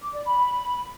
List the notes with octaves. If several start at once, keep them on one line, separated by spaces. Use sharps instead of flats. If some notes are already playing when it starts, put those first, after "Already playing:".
D6
D5
B5